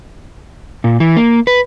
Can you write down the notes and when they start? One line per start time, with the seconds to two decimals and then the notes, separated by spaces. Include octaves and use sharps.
0.84 A#2
1.00 E3
1.17 A#3
1.47 B4